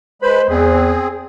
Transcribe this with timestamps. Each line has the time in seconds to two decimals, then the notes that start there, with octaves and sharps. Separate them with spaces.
0.22 G#3 B4 C5 B5
0.49 E2 C4 G#4